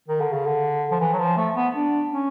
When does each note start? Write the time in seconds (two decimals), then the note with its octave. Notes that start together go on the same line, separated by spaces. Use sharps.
0.08 D#3
0.21 D3
0.33 C#3
0.47 D3
0.91 F3
1.00 E3
1.13 F#3
1.19 F3
1.37 A3
1.55 B3
1.75 D4
2.11 C#4